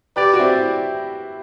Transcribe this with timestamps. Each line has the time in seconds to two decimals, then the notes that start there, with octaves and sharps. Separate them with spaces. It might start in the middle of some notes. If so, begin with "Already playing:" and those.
0.16 G4 B4 D5
0.33 F#4
0.39 C4 E4